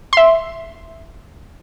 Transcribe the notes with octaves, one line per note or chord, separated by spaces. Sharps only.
E5 C6